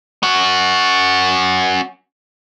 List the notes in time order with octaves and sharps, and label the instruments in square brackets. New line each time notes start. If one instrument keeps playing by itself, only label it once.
[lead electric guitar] C#4 F#4